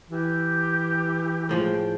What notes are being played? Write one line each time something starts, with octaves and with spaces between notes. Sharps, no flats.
E3 G4
A2 F3 G#3 G5